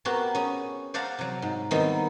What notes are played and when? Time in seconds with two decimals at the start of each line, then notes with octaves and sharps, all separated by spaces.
0.05 B3 C4 F#4 G4 A#4
0.35 C#4 G#4
0.94 C5 D5 F5 F#5 A5 A#5
1.18 C3 F#3
1.42 G#2
1.71 D#3 G3 B3 C4 D#4 E4